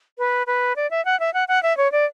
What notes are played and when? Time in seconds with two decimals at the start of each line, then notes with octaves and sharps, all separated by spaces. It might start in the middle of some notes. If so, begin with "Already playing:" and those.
0.19 B4
0.47 B4
0.76 D5
0.91 E5
1.05 F#5
1.20 E5
1.34 F#5
1.48 F#5
1.63 E5
1.77 C#5
1.92 D5